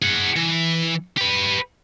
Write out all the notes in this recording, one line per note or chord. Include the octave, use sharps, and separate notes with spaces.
G#4 F#5
E3
G4 B4